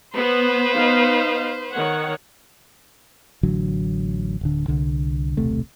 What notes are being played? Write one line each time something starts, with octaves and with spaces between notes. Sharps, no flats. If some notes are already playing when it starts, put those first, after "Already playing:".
B3 B4 C5
B3 D#4 F5
D#3 C#5 F#5
A1 D3 F#3
D1 D3
C2 D3
D#1 B1 C3 A3